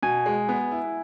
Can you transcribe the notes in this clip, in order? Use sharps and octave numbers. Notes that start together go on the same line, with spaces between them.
B2 G#5
G#3
B3
E4